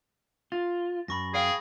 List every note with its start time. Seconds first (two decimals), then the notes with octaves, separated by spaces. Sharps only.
0.52 F4 A6
1.08 F#2 B5 C#6 A#6
1.34 G#4 F5 G5